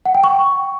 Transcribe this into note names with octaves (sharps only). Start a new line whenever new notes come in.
F#5
G5
C#6